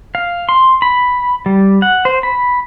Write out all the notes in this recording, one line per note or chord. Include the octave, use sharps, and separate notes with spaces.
F5
C6
B5
G3
F#5
C5
B5